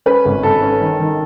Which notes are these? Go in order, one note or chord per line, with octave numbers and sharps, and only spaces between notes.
C#4 B4
G#1
G#1 A4
C#4
D#3
D#3